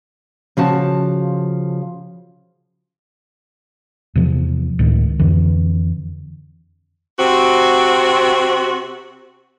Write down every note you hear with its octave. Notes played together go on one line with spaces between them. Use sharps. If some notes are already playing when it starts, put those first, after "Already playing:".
C#3 F3 F#4 A5
E2 C3 F3
C#2 A2 D#3
F2 D3 E3
C3 C4 F#4